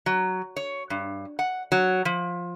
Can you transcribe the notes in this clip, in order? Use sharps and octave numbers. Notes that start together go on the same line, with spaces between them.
F#3
C#5
G2
F#5
F#3
F3